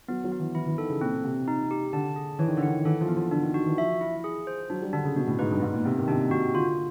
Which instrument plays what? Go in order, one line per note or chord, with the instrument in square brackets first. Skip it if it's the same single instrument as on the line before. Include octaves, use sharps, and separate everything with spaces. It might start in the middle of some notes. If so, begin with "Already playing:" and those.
[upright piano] F#3 [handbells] B3
[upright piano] F#3
[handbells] B3
[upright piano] E3
[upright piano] E3 [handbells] E4
[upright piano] E3
[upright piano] D#3 [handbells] A4
[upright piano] C#3
[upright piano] A#2 [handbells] C4
[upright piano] A#2
[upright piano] C3 [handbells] C4
[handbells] D#4
G4
[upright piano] D3 [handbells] A5
[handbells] G#4
[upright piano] E3 [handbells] C#5
[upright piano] D#3
D3
[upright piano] D#3 [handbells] F#5
[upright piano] E3 [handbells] A4
[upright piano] F3
[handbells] B3
[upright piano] F3
[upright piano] D3 [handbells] D4
[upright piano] D#3
D3
[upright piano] D#3 [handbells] F#4
[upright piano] E3
[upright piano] F3 [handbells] E5
[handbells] E4
G#4
C5
[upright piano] F#3 [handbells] D4
[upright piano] G3
[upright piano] D3 [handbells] D4
[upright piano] C#3
[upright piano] B2 [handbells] F#4
[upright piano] A2
[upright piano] G#2 [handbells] B4
[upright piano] G2
[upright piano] G#2 [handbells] B3
[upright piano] A#2
[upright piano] C3 [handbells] B3
[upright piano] D#3
[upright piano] C3 [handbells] D4
[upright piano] C3 [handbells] F#4
[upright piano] D3 [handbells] F4